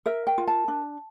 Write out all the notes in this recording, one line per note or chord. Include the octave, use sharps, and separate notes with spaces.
A#4 E5
G5
F4
A5
D4